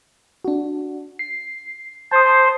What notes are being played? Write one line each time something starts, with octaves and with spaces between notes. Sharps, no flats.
D4 F#4
C7
C5 A5 D#6